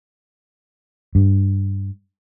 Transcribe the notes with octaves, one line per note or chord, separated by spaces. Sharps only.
G2